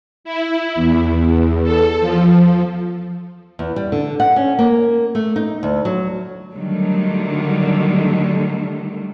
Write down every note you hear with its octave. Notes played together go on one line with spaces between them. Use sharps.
E4
E2
A4
F3
E2
G3
D3
F#5
C#4
A#3
A3
D#4
D2
F#3
D3 D#3 F#3 G3 A3